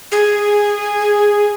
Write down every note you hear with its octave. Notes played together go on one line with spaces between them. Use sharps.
G#4